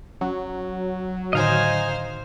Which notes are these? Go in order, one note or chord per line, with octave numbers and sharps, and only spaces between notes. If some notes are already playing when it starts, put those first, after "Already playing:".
F#3 C#4
A2 D3 D#3 D#4 C5 D#5 F5 G#5